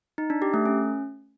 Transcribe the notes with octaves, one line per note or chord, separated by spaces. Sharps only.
D#4
D4
G4
A3
C#4